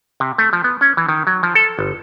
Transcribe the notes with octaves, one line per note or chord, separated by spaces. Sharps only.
C3
A3
F3
B3
C#4
E3
D#3
F#3
F3
A4
G1